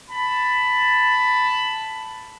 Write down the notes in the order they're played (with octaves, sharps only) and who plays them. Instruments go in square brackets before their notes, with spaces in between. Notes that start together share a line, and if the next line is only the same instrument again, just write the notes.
[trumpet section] A5 B5